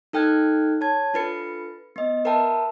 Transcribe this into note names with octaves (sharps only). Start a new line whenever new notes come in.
D#4 A4 G5 F6 F#6 G#6
C#5 A5 G#6
D4 F4 A4 B4 A6 C#7
B3 D#5
A#4 B4 E5 G5 A5 A#5